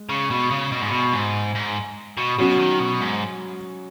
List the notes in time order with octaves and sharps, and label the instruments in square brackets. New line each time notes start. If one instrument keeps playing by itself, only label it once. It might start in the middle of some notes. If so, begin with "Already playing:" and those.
Already playing: [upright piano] G#3
[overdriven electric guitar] C#3
B2
C#3
B2
G#2
B2
G#2
G#2
B2
[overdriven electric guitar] B2 [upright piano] F#3 C#4 F#4
[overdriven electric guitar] D#3
B2
G#2